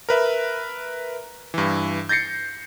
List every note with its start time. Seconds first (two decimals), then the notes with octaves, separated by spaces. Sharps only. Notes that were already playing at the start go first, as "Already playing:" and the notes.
0.09 A#4 B4 E5
1.54 G2 E3
2.09 G6 A6 A#6 C7 C#7